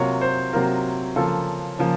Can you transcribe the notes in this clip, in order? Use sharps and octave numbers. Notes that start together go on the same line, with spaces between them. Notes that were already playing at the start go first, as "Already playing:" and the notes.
Already playing: C3 F#3 A#3 F4 C#5
C5
C3 F#3 A#3 F4 A#4
C#3 F3 A#3 F4 A4
C#3 F3 A#3 F4